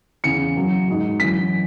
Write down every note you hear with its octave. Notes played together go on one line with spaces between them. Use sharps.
E2 C#3 E3 C#7
F#2 F#3
G#2 F#3
F#2 E3 B6